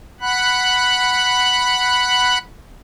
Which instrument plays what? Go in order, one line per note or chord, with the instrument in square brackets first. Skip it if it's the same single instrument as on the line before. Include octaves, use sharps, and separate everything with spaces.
[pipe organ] F#5 B5 F#6